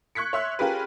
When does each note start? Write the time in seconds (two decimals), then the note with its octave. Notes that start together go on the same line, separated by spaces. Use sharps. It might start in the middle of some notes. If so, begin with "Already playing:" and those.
0.15 C#6 F#6 G#6 B6 C#7
0.33 C#5 E5 C6 F#6
0.59 C#4 F4 G4 G#4 A#4 B4